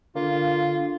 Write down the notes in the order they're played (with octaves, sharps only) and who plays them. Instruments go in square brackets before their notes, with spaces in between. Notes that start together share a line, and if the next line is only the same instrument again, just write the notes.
[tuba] D3 [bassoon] A#3 [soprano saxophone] F4